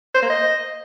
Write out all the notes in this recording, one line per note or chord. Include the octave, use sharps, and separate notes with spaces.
C5
A#3
D#5